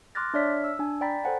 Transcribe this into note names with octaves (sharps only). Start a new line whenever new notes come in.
C6 D6 F6 F#6 A6 A#6
D4 C#5 D5 E5 F6 B6
E6
D4 G#5
D5 G5 A#5 B5 A6 B6
A4 C5 F#5 G#5